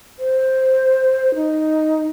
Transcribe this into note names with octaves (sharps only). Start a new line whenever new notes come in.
C5
D#4